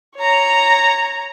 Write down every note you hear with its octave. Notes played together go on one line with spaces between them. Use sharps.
C#5 A#5